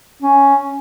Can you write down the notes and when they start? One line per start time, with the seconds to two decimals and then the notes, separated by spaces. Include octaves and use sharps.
0.22 C#4